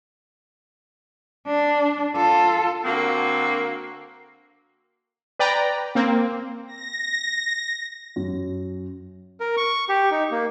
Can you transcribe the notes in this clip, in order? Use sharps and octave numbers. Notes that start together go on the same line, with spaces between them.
D4
F4 A4
D3 A#3 C4 F#4
B4 D5 G5 A#5
A#3 C4
A#6
F#2
A#4
C#6
G4
D#4
A#3